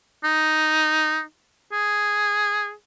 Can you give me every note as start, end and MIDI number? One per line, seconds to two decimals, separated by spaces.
0.24 1.21 63
1.72 2.72 68